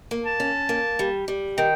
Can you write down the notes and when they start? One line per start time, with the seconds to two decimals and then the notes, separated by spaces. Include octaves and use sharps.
0.11 A#3
0.25 A5
0.40 C#4
0.69 A#3
0.99 G3
1.28 G3
1.58 D#3 G5